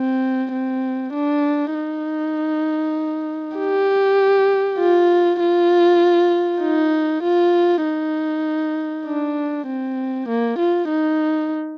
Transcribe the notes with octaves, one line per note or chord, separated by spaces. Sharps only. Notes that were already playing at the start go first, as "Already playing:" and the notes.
Already playing: C4
C4
D4
D#4
G4
F4
F4
D#4
F4
D#4
D4
C4
A#3
F4
D#4